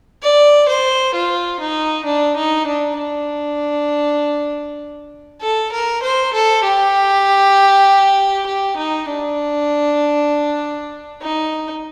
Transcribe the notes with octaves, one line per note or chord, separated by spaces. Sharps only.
D5
C5
F4
D#4
D4
D#4
D4
D4
A4
A#4
C5
A4
G4
G4
D#4
D4
D#4